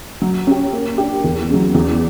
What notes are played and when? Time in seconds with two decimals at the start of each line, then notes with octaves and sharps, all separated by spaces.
0.22 F#3
0.47 C#4 G4
0.73 A#3
0.98 D4 G4
1.24 E2
1.49 C#3 F#3
1.74 E2